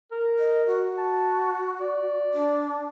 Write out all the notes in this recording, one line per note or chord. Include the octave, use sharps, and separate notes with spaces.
A#4
D#5
F#4
A5
D5
D4